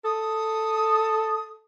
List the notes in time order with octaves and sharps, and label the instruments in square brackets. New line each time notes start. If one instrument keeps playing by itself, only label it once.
[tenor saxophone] A4 [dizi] D#6